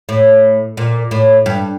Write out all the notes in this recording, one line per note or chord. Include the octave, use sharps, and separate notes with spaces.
A2
A#2
A2
G2